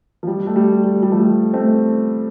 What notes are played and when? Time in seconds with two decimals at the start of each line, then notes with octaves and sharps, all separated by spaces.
0.23 F3
0.27 G3
0.47 A3
0.56 G3
0.84 G3
1.03 G3
1.12 F3 A3
1.53 A3 C4